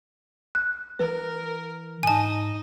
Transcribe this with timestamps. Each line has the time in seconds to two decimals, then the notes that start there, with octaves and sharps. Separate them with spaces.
0.55 F#6
0.99 E3 A#4 B4
2.03 G#2 D#4 D#5 G#5 A5